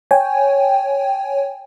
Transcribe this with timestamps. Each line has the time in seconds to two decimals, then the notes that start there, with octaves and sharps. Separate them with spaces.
0.11 C#5 G5 G#5